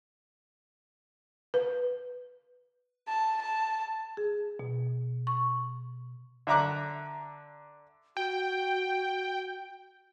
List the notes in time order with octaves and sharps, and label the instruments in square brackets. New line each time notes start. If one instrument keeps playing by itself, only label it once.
[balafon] B4
[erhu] A5
A5
[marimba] G#4
B2
C#6
[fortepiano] D3 E5 A#5 D6 F#6
[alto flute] F#4 [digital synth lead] G5